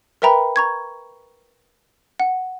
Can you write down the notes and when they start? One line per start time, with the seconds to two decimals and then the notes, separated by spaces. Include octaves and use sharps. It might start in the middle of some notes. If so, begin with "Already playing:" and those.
0.22 A#4 B4 E5 G5 A#5 B5
0.56 A#5 C#6 G#6
2.20 F#5